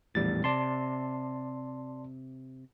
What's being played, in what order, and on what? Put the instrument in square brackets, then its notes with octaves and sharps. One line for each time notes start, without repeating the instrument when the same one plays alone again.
[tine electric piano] A#1 G3 A6 [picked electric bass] E2 A2
[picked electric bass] C3 [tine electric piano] D5 A5 C6